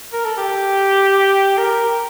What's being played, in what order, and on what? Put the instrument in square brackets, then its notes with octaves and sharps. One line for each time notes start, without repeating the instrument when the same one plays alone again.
[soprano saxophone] A#4
A4
G4
A#4